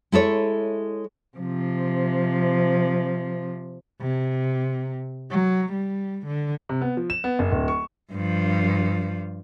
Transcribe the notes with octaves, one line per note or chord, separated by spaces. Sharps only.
G#3 E4 A4 C#5
C3 F3
C3
F#3
G3
D3
C3
B3
F3
E7
B3
F#1
D1
C#6
G2 F3